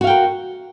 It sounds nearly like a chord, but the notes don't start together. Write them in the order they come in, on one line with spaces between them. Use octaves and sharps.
F#4 F5 G5 A#4